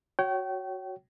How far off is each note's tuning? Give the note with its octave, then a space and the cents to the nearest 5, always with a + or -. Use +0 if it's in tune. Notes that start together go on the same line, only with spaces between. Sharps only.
F#4 +0 C#5 +0 G5 -35